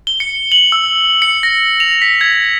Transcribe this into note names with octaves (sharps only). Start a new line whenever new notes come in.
G7
C#7
F#7
E6
C#7
A#6
F7
B6
G#6